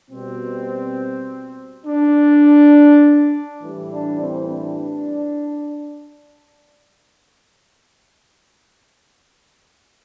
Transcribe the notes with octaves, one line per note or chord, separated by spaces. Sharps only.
B2 G3 C4
D4
A2 E3 G3
D4
C4
D4